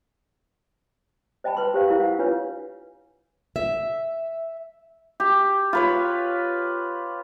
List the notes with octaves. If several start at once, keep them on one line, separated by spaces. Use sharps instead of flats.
C5 D#5 G5 A5 B5
B4 C6
G4 C5 F5
E4 A#4 F5 C#6
F5 F#5
D4 F4 B4 C#5
E5
G4
F4 B4 C#5